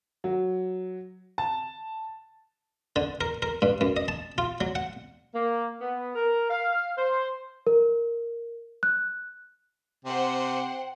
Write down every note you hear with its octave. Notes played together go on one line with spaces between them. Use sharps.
F#3
A5
D3
A#4
A#4
G2
F#2
D#5
A5
F4
F#3
F#5
A#3
B3
A#4
F5
C5
A#4
F#6
C3 C5 F#5 G5